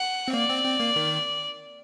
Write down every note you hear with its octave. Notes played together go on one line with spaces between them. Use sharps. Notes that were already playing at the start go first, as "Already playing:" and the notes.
Already playing: F#5
C4
A#3 D5
C4
C4
A#3
D#3